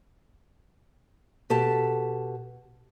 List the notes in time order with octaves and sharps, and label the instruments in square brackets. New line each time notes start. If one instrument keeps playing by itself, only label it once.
[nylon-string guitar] B2 G4 A4 A5